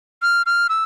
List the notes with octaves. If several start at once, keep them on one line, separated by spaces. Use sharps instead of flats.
F6
F6
E6